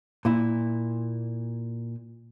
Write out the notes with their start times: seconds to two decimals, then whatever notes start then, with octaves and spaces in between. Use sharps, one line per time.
0.25 A#2 E4